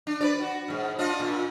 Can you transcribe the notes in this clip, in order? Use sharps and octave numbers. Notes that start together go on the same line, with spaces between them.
D4
B4 C#5 D5
F#4
G#2 B2
D4 F4 D#5
A#2